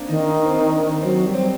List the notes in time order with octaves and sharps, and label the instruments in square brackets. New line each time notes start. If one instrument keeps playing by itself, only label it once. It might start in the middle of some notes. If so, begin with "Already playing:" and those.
Already playing: [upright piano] A#3 C4 D4
[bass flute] D#3 [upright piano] D#4
[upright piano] D#4
C4
D4
[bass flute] F#3 [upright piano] C4
[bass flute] G3
[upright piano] C4